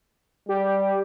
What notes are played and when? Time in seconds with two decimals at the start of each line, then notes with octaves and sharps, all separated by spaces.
0.49 G3 G4